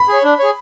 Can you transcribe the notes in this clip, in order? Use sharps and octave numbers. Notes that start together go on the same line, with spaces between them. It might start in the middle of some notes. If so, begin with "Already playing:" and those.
Already playing: B5
G#4 C#5
D4
G#4 C#5